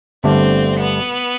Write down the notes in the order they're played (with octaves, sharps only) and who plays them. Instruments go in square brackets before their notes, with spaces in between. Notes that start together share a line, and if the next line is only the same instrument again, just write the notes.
[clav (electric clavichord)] G1 G2 D3 A3 D4 [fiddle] C4
[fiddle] B3